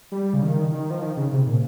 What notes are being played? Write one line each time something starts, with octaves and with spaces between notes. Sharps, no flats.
G3
C#3
D#3
D#3
F3
D#3
C#3
C3
A#2